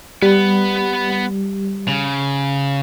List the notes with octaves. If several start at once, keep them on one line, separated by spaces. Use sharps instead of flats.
G3 B3 B4
C#3